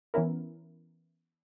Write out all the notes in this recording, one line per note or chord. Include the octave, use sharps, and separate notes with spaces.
E3 B3 C#4 E4 A#4